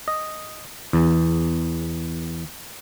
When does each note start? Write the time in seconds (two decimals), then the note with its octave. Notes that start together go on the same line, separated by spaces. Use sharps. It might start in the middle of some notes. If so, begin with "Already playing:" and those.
0.08 D#5
0.93 E2